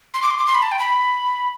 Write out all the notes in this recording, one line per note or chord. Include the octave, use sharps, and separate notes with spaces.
C6
D6
C6
D6
C6
B5
A5
G5
B5